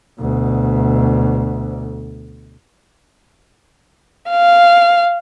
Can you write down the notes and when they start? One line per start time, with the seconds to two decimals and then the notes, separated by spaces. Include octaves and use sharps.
0.20 D2 B2
4.29 F5